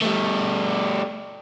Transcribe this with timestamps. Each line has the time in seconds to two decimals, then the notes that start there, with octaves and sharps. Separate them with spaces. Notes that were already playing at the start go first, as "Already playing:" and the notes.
0.02 G3 A3